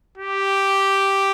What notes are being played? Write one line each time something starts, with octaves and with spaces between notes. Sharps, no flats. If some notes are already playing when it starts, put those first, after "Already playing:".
G4